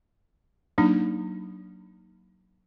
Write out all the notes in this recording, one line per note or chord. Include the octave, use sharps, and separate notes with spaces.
F#3 A#3 D4 D#4